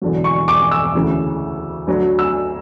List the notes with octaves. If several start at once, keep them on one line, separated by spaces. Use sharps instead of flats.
E1 E2 D3 F#3
C#6
D6
E6
D2 C#3 E3
D2 D3 F#3
E6